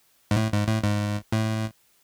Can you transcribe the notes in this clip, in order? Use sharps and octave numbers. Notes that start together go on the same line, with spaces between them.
G#2
A2
G#2
A2
G#2
A2